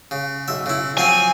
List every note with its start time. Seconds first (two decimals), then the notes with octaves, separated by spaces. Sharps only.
0.11 C#3
0.48 B1 E5
0.66 C#3 E4
0.98 F3 F#3 C4 G#5